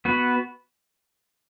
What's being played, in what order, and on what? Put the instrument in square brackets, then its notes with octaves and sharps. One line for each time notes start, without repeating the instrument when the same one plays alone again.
[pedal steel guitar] B3 F#4 B4